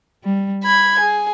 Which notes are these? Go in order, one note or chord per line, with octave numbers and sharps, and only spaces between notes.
G3
B5 G#6
G#4